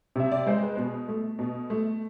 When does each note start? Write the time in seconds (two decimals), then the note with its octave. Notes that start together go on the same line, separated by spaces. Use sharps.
0.16 C3 E5
0.32 D5
0.47 G#3 C5
0.62 B4
0.77 B2
1.08 A3
1.39 B2
1.70 A3